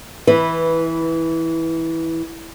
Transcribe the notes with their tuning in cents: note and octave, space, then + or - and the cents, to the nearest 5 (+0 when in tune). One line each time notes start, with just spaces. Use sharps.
E3 -10 B4 +0